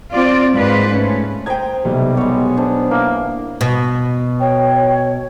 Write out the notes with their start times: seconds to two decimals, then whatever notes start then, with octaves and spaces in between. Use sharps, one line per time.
0.13 C4 F4 D5
0.55 G#2 A#3 F4 B4 C5
0.89 A3 C#4
1.46 C5 D#5 G5 A#5 G#6
1.85 B1 C3 G3
2.17 G#3 B3 C#5
2.57 D4 C5
2.91 E3 A#3
3.61 B2
4.40 C#5 G5